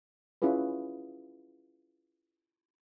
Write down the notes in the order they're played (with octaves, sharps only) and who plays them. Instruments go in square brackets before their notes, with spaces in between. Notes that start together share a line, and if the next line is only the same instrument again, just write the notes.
[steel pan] C#4 E4 F4 G#4 B4